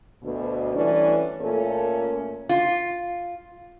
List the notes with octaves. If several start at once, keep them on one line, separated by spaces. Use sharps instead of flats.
D2 B2
E3 G3 A3 C#4 D4 D5
A#2 A3 C#4 A4 A#4
F4